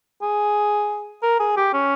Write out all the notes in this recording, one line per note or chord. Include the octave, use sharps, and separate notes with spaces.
G#4
A#4
G#4
G4
C#4